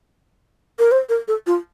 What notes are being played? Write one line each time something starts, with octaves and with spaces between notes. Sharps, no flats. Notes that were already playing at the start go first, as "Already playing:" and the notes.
A#4
C5
A#4
A4
F4